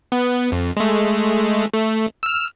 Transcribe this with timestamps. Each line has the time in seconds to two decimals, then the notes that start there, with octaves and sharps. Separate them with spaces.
0.12 B3
0.52 F2
0.77 G#3 A3
1.74 A3
2.23 E6 F6